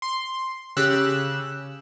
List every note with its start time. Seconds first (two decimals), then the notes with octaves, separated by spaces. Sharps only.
0.02 C6
0.77 C#3 G4 E6 F#6